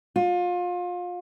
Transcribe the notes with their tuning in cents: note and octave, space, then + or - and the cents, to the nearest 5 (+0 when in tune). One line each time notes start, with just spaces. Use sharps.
F4 +30